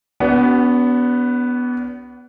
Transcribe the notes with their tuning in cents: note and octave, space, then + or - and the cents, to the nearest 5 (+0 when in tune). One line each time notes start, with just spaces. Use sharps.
B3 +0 D4 -45 F#4 +35